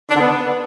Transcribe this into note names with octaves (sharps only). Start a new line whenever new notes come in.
D4
D3
B3